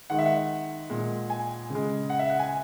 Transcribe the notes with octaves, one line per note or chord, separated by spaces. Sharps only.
D#3 G#3 F#5
E5
F#5
A#2 G#3
G#5
C#3 G#3
F#5
E5
F#5
G#5